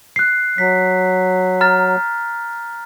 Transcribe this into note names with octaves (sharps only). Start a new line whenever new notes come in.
F#6 C7
F#3 B6
A#5 F6 A6